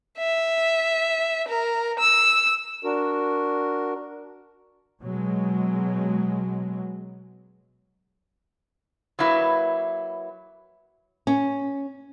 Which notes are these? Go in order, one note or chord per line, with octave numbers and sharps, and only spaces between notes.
E5
A#4
E6
D4 F#4 A#4
B2 F#3 G#3
F#3 A#3 E4 B4
C#4